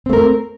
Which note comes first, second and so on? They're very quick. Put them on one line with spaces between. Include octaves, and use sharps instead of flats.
C4 A3 A#4